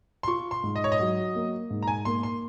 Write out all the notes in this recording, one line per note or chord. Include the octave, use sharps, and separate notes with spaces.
C6
F4 C#6
C6
G#2
D#5
C#5
D#5
F#3
A#3
G#2
A#5
G#5
A#3 C6
C6